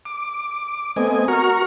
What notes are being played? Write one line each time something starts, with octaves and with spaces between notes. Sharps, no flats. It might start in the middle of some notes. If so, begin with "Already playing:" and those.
D6
A3 B3 C4 D#5 G#5
F#4 A#4 A#5 C#6 F6